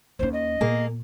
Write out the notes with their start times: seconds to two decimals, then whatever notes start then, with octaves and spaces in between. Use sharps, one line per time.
0.19 D#2 C#4 C5
0.33 D#5
0.61 A#2 A#3 G#4